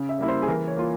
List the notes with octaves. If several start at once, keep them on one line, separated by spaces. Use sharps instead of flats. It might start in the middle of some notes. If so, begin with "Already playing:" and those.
Already playing: C#3
E5
G3 A#3 E4
C5
G#4
E3 A#4
C#5
A#3 F4